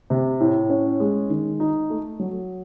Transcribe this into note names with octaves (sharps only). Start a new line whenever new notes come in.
C3
A2
C#4
G#3
D#3
D#4
A3
F#3